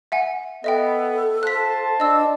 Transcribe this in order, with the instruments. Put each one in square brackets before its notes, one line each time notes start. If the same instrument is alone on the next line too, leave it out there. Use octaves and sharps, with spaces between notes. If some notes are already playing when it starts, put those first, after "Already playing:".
[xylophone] E5 F#5 G#5
[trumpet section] B3 [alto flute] A4 [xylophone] D#5 E5 G5
[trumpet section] F4 C5 A5 [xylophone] F#6 B6
[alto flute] D4 [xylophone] D#5 E6